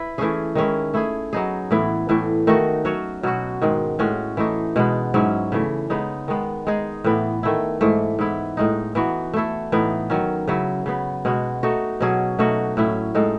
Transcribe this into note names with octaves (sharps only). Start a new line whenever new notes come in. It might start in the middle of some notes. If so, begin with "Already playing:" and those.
Already playing: E4 B4
E3 A3 C#4 G#4
D#3 G#3 C#4 E4
A3 E4 G#4
F#3 B3 D#4 G#4
A2 E3 B3 E4
A2 E3 A3
D#3 A3 D#4 F#4
F#3 C#4 F#4 C#5
B2 F#3 B3 F#4
G#2 D#3 G#3
A2 G#3 C#4 F#4
E3 A3 D#4
B2 G#3 B3
G#2 F#3 C#4 E4
C#3 E3 A3
C#3 G#3 B3 D#4
D#3 G#3 B3
G#3 D#4 G#4
A2 E3 B3
D#3 A3 E4
G#2 E3 A3
G#2 E3 B3 E4
A2 G#3 D#4
E3 B3 D#4 F#4
A3 E4 A4
A2 E3 B3 D#4
D#3 F#3 C#4
C#3 F#3 C#4 E4
C#3 F#3 B3
B2 G#3 B3 F#4
A3 D#4 F#4 A4
B2 F#3 C#4 G#4
B2 A3 D#4 F#4
A2 F#3 C#4 E4
A2 G#3 D#4 A4